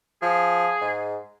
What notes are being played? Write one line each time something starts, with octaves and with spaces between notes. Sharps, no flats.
F3 G#4
G#2